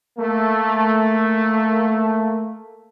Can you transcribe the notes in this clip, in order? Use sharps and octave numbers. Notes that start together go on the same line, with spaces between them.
A3 A#3